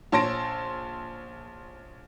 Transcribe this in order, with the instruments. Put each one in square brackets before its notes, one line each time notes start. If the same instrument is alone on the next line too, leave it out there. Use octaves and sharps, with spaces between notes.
[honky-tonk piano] A#1 C#5 A5 C6 A#6 D7